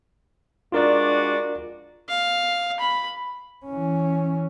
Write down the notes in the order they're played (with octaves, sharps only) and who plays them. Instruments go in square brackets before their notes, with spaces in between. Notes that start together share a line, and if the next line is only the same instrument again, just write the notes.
[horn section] G#3 D4 F#4 [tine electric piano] F4 A#4 D5
[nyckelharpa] F5
B5
[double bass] E3 C#4